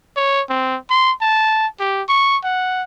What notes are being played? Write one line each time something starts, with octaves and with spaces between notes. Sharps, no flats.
C#5
C4
C6
A5
G4
C#6
F#5